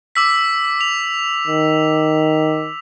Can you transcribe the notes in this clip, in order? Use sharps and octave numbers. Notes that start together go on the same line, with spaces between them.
D6 E6 B6
F7
D#3